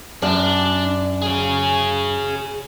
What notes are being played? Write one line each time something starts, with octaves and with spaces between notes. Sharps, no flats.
F#2 D4
G#4 C#5